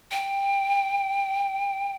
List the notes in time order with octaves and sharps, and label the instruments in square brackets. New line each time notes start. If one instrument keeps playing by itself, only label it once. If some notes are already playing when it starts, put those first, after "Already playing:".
[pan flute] G5